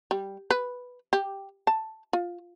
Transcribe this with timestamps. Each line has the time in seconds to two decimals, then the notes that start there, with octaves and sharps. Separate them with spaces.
0.11 G3
0.51 B4
1.13 G4
1.67 A5
2.13 F4